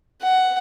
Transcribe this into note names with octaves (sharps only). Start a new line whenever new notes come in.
F#5